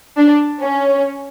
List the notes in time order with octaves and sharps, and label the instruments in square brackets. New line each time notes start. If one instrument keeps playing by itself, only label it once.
[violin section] D4
C#4